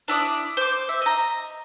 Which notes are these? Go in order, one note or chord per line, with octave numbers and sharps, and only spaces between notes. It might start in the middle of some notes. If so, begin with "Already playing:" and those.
D4 E4 D5 D#6
C5 D6
E5
D#5 A#5